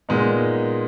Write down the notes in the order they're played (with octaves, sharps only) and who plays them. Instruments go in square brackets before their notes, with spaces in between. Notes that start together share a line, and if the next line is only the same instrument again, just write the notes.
[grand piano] A#2 G#3 B3 D#4